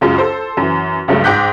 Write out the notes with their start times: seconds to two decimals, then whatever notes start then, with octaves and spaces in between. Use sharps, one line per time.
0.01 C#2 F#2 G#3 F4
0.18 A4 C5
0.57 F#2 E3
1.08 C#2 G2 F#3 G#3 A3
1.24 G#2 G5 D6 F#6 G6 B6